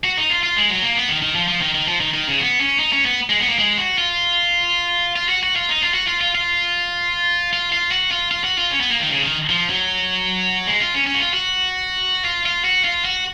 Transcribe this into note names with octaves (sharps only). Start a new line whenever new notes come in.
F#4
D#4
F4
F4
G#3
F#3
A#3
B3
D#3
D#3
F3
F3
D#3
D#3
F3
D#3
D#3
C#3
B3
C#4
D#4
C#4
B3
G#3
B3
A#3
G#3
F#4
F4
F4
F#4
F#4
F4
D#4
F4
F#4
F4
F4
F4
F4
F4
F#4
F4
F4
F#4
F4
C#4
B3
A#3
D#3
C#3
D#3
F3
F#3
G#3
F4
C#4
C#4
F#4
F4
F#4
F4
F4
F#4
F4
F#4